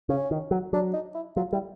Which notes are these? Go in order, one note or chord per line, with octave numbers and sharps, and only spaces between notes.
C#3 C#4
D#3
F#3
F#3 D4
D#4
E4
F#3 F4
G3 E4